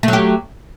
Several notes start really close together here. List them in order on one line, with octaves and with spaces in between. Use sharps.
A3 F#3 G4